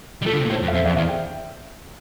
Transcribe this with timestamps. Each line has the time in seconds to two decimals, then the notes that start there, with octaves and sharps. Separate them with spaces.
0.22 G3
0.25 A3 F4 A4
0.33 D3
0.38 C3
0.45 A#2
0.50 A2 A4 C5
0.62 F2
0.68 F5
0.73 F2 C5 E5
0.85 F2 D5 F5
0.97 E2 D5 F5
1.08 E5 G5